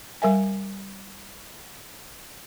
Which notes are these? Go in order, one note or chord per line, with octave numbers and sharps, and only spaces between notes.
G3 A#4 E5 G#5